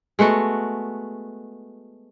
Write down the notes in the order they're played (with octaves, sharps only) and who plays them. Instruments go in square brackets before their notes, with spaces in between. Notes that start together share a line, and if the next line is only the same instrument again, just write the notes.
[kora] G#3 A3 B3 F#4